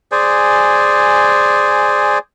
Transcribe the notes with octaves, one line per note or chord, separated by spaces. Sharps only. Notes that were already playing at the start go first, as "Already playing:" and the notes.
G#4 C5 D5 G#5